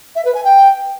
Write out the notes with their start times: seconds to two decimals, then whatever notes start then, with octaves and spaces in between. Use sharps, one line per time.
0.15 E5
0.25 B4
0.34 G#5
0.44 G5